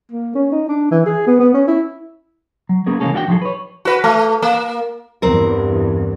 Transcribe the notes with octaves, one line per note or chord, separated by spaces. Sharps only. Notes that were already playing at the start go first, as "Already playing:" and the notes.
A#3
C#4
D#4
D4
E3
G#4
B3
B3
C#4
E4
F#3
A#3 B3 C#4 G#4 A#4
C#3 E3 G#3 A#3 C#4 A4
D4 F#4 E5 G5
F3 F#3 D#4 F4 G#4 A4
B4 C#5
F#4 B4
A3
A#3
E2 G2 C4 A#4